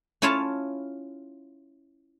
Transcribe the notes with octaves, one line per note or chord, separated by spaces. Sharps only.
C#4 E4 F4 C#5 F5 A5